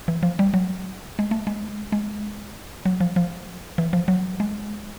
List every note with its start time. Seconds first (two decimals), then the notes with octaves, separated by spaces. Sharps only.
0.08 E3
0.23 F3
0.39 G3
0.54 F#3
1.19 G#3
1.31 A3
1.47 G#3
1.92 G#3
2.85 F#3
3.00 F3
3.16 F3
3.78 E3
3.93 F3
4.08 F#3
4.40 G#3